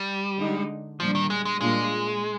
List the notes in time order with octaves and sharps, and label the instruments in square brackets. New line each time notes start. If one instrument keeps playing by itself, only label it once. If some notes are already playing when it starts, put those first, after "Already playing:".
Already playing: [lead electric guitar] G3
[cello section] D3 G#3 D#4
[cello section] A#2 G3 D4 [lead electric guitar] F3
[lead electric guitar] D#3
G#3
G#3
[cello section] A#2 G3 A#3 D4 F4 [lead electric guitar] G#3